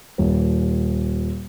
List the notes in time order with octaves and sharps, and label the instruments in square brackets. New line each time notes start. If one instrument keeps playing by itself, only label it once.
[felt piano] D#1